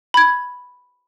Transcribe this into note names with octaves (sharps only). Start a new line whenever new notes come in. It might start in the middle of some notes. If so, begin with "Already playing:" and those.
B5 G#6